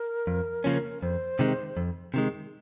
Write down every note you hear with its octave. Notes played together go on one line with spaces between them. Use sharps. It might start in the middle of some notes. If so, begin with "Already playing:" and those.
Already playing: A#4
F2
C#3 F3 A#3 C#4
F2 C5
C3 D#3 G#3
F2
C3 D#3 G#3